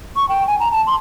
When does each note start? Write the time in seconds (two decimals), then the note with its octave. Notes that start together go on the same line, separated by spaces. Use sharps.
0.16 C#6
0.29 G5
0.47 G#5
0.60 A#5
0.72 A5
0.87 C6